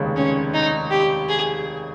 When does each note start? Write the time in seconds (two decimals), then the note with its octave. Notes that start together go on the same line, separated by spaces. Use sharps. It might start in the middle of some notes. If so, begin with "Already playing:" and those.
Already playing: F1 D#2 C#3 G#3
0.16 C#4
0.54 D#4
0.91 G4
1.28 G#4